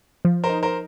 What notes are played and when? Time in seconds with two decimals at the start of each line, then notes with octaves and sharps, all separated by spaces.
0.25 F3
0.44 A#4 C5
0.49 D#4
0.63 A#4 C5